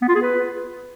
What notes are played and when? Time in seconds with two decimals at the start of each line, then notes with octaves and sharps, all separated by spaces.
0.02 B3
0.09 F4
0.15 G#4
0.22 B4